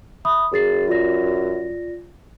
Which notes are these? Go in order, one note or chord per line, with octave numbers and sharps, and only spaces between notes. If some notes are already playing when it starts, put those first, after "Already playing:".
E5 B5 D#6
F#2 G#4 A6 C7
F4 D5 A#6